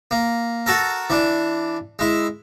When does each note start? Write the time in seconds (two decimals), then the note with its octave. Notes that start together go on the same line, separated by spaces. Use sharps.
0.11 A#3
0.66 F#4 A4 A#4
1.10 E3 D4
1.99 G#3 E4